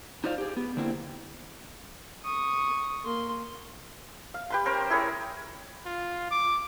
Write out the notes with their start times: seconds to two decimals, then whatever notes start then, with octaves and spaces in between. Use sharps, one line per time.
0.24 D#4 F4 C5 D5 F5
0.38 G4 G#4
0.57 B3
0.77 D3 A#3 C4 E4
2.24 C#6 D#6
3.04 A#3 C6
4.34 F5
4.50 G4 B4 C6
4.66 C#4 A#4 C5
4.90 E4 G#4 A#4 C#5
5.86 F4
6.31 D6